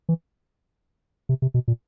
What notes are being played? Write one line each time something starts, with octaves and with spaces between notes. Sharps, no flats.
E3
C3
C3
B2
A#2